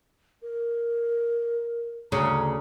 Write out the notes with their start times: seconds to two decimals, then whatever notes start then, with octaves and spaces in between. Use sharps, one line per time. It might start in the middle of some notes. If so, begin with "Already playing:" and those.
0.42 A#4
2.12 D2 C#3 A#5